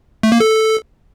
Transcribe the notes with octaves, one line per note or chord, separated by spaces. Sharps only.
A3
A#3
A4